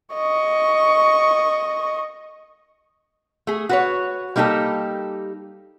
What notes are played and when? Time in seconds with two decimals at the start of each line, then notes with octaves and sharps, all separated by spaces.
0.14 D#5 C#6
3.47 A3 G#4
3.69 F#4 B4 C#5
4.36 G3 A#3 D#4 G4 A4